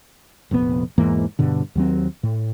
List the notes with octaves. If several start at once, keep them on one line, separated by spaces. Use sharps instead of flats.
F1 A#1 C3 B3
E2 G#2 E3 A#3
G2 B2 D3
D#2 F#3 C4
A2